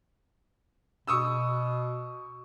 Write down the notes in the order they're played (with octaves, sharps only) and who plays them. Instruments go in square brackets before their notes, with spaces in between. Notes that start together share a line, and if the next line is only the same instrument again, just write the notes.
[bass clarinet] B2 [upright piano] C#6 D#6 E6